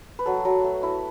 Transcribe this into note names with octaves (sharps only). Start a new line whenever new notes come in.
B4
F#3 A4
F#3
A3
E4